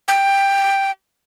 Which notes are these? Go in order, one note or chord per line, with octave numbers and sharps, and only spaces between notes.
G5